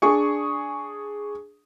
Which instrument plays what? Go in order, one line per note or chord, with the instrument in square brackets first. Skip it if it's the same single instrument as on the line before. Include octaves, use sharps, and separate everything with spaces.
[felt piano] D4 G#4 C#6